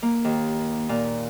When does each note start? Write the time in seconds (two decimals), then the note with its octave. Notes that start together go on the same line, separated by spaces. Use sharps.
0.02 A#3
0.24 D#2
0.89 A#2